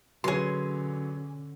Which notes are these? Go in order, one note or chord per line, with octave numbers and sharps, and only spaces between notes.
D3 F#3 C#4 G#4 B4 C#5 C6